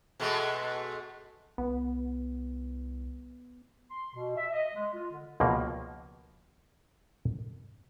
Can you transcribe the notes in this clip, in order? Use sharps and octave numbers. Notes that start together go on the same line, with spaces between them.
B2 G#3 A3
C2 B3
C6
B2
E5
D#5
G#3
F4
D3
C#2 B2 F3 A#3